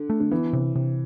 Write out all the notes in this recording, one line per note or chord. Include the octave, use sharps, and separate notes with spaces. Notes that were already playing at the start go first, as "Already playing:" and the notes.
Already playing: D3
A3
D3
E3 B3
C3
C3